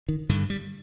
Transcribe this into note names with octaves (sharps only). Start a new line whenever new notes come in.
D#3
G2 D3 D#3
G3